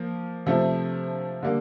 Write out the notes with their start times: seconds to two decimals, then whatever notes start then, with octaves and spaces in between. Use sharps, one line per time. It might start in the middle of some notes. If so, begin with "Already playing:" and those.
Already playing: F3 A#3
0.46 C3 F3 A3 C4
1.42 D3 G3 A#3